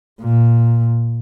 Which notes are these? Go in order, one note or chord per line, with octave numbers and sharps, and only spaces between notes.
A#2